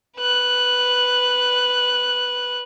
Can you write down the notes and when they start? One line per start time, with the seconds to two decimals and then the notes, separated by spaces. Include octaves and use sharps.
0.17 B4 F#6